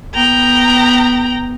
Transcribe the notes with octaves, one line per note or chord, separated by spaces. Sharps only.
B3 G5 A#5